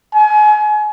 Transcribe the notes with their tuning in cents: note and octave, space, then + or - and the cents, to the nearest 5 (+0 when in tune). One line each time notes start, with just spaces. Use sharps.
G#5 +30